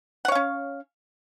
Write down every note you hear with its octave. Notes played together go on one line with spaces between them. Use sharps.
C#4 C#5 F5 F#5